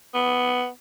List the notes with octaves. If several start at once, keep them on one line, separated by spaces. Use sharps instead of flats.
B3